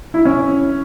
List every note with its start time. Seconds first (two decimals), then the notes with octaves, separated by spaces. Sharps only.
0.14 E4
0.25 C#4